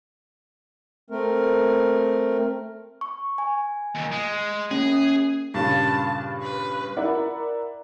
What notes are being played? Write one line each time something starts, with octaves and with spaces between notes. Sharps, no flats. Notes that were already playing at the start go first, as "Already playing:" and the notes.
A3 C4 A#4
C#6
G#5
D#2 A#2
G#3
A#3 C#4 G#4
G2 A#2 C#3 A5
B4
E4 A#4 D5 F#5